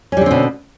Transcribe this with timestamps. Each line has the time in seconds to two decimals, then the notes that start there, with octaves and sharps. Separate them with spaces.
0.12 C#4
0.17 G3
0.21 D3
0.26 C4
0.31 B2